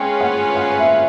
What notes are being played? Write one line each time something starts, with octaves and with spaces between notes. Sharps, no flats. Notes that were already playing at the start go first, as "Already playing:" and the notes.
Already playing: G#3 C#4 F4 G#4 B4 G5
F#5
F#5
E5